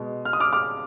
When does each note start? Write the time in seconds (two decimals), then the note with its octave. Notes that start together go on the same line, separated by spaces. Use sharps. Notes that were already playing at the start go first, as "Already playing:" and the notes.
Already playing: B2 G#3
0.25 F6
0.33 D#6
0.40 D6 F6
0.53 D6 F6